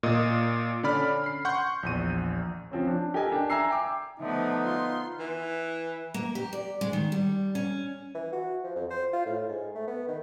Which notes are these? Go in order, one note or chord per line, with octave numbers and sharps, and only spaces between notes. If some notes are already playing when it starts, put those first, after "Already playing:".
A#2 A#3 D#5 D#6
D3 C#4 D5 B5 F6
B5 C7
F#5 C6 C#6 G6
A#1 E2 D#7
F3 C4 C#4
D4
G4 A4 A#4 D#5 G#5
D4 G5
E5 G#5 A#5 E6 C7
G5 D6
D3 F3 A3 B3 D#4 E5
F4 C6
E3
A#3
G4
D5
G#3
D#3
G3
C#4
E3
F#4
F3
F2
C5
F4
A2
G#2
A3
B3
D#3